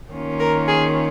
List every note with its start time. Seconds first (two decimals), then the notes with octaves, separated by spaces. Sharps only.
0.12 D#3 A#3 C#4 F4
0.40 A#4
0.68 G#4